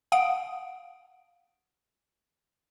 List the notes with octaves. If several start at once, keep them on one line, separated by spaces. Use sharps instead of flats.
F5 F#5 D#6 D7